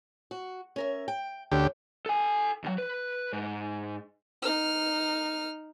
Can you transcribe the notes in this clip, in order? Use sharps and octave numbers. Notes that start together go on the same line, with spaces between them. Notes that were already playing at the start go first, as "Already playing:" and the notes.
F#4
C#4 A#4 E5
G5
D2 C#4 G4
A4 G#5
D#2 F#3
B4
G#2
D#4 F6